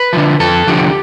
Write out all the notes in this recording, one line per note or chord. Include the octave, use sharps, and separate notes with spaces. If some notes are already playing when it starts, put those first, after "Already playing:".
Already playing: B4
D3 F3
F2 A4
D3 F3 G4